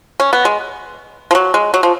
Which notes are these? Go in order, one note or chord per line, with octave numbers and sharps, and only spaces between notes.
C#4
B3
G#3
F3
F#3
G#3
F#3
F3